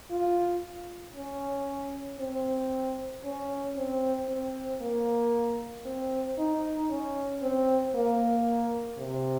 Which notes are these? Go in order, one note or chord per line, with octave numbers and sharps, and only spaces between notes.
F4
C#4
C4
C#4
C4
C4
A#3
C4
D#4
C#4
C4
A#3
C3